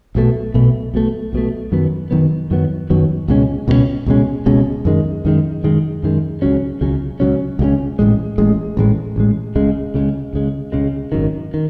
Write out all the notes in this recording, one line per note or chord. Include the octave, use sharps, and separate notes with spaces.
B1 B2 A3
B1 B2 A3
B1 B2 A3
B1 B2 A3
F#2 D#3 F#3 B3
F#2 D#3 F#3 B3
F#2 D#3 F#3 B3
F#2 D#3 F#3 B3
C#2 B2 G#3 C#4
C#2 B2 G#3 C#4
C#2 B2 G#3 C#4
C#2 B2 G#3 C#4
F#2 D#3 G#3
F#2 D#3 G#3
F#2 D#3 G#3
F#2 D#3 G#3
C#2 C#3 F#3 C#4
C#2 C#3 F#3 C#4
C#2 C#3 F#3 C#4
C#2 C#3 F#3 C#4
A1 A2 G#3
A1 A2 G#3
A1 A2 G#3
A1 A2 G#3
C#2 C#3 G#3
C#2 C#3 G#3
C#2 C#3 G#3
C#2 C#3 G#3
G#1 F#2 D#3
D#3